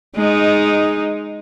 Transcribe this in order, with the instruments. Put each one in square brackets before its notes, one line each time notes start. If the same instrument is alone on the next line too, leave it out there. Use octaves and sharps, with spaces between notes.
[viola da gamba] G#3 D#4